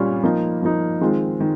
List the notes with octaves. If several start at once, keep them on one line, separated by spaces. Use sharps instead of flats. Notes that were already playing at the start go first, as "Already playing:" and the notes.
Already playing: A#2 G3 C#4 F4
F3 A#3 D#4
F3 A#3 D#4
D#3 G#3 C4 F4
D#3